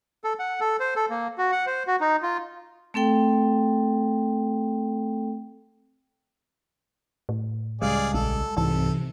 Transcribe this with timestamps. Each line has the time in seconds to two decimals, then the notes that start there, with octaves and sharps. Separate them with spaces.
0.24 A4
0.39 F#5
0.60 A4
0.80 C5
0.96 A4
1.10 A#3
1.38 F#4
1.52 F#5
1.66 C5
1.87 F#4
2.01 D#4
2.22 F4
2.94 A3 C4 A4 G5
7.29 A2
7.82 C#2 G3 G#3 G#4 D5 F5
8.14 A#1 A4
8.57 C2 G#2 C3 E3 A4